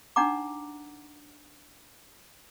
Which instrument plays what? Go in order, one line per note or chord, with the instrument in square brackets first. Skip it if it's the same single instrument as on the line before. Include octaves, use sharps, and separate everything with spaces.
[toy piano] D4 D#4 F#5 A#5 D6